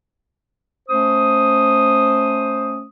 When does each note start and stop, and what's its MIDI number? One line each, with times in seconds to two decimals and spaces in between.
0.89 2.84 57
0.89 2.84 61
0.89 2.84 72
0.89 2.84 87